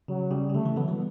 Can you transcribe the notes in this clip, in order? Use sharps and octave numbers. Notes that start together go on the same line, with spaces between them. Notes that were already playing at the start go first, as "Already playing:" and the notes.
C#3 F#3
C#3 G3
C#3
D3 A3
C#3 E3
D3 F#3 B3
E3 G3